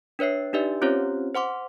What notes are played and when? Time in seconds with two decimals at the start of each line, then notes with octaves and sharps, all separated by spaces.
0.19 D4 B4 C#5 E5 C7
0.53 D4 D#4 G4 B4 D5 E5
0.82 C4 C#4 F4 G4 C5 C#5
1.35 C5 F#5 C6 D6